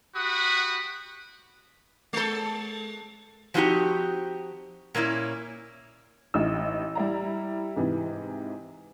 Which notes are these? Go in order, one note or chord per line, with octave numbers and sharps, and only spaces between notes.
F#4 G4 F#5 B5 D#6
G#3 A4
F3 F#3 C4 D#4 F#4 G4
A#2 A#3 C#4 E4
A1 D#4 E4 E6
G3 E4 A#5
G#2 C3 E3